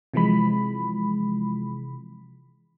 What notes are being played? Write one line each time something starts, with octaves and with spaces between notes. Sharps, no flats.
C3 E3 F3 G#3 B5